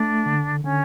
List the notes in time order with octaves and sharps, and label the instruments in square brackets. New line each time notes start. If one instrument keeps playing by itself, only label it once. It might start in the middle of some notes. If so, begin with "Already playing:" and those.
Already playing: [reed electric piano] A3 [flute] D4
[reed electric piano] D3
[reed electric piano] D3 [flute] C#4